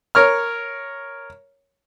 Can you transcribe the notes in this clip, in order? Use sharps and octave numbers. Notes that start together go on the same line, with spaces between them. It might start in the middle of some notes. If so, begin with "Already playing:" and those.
A#4 C#5 F6